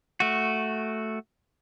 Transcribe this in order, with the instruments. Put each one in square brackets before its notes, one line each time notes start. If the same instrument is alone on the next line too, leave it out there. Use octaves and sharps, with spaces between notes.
[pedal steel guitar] A3 F#4